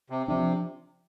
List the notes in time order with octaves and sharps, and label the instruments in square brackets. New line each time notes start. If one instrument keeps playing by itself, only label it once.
[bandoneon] C3
[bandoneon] C3 [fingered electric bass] F3 D4